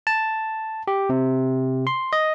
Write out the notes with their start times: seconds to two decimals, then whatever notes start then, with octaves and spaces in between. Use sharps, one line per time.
0.07 A5
0.88 G4
1.10 C3
1.87 C6
2.13 D#5